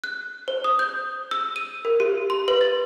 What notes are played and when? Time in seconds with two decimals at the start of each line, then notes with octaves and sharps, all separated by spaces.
0.04 F#6
0.48 C5
0.64 D#6
0.79 G6
1.31 E6
1.56 D#7
1.85 A#4
2.00 G4
2.30 C6
2.48 B4
2.61 A6